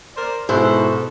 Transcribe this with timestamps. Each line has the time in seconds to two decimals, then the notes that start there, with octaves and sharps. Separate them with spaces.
0.16 A#4 C5 D5
0.49 G#2 B2 E4 A4 C5